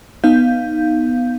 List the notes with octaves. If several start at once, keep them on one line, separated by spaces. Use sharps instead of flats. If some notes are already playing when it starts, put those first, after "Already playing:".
B3 D#4 F5 G6